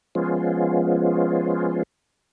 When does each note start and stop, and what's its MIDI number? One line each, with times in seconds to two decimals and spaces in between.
0.15 1.83 53
0.15 1.83 56
0.15 1.83 59
0.15 1.83 61
0.15 1.83 65